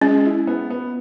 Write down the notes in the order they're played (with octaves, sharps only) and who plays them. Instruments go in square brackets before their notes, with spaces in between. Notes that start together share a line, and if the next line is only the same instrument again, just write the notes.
[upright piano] G#3 [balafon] C#4
[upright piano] E4
B3
B3